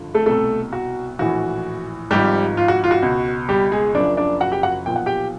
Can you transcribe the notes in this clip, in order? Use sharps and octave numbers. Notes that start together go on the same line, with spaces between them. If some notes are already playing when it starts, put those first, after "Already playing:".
Already playing: G#1 G2 D3 F3
A3 A4
C2 B2 A3 A4
F#4
A#1 A2 E3 F#4
G#1 G#2 F3 G3 G4
F4
F#4
F4
F#4
C#2 B2
G3 G4
G#3 G#4
F#1 F#2 C#3 F3 D4 D5
D4 D5
F#4 F#5
G4 G5
F#4 F#5
B1 A#2 F3 G5
F#5
G4 G5